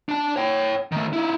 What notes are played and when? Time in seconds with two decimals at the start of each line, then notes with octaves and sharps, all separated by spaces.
0.09 D4 A5
0.36 C#5 G5
0.92 D#3 A3
1.13 D#4 E4